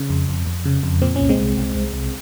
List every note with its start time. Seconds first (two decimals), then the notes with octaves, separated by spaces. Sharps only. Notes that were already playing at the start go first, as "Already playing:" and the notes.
Already playing: C#3
0.10 F2
0.29 F2
0.46 F2
0.65 C#3
0.83 F2
1.02 A#2 C4
1.16 C2 C#4
1.29 G#3 C4
1.39 C2
1.57 C2
1.75 C2
1.93 C2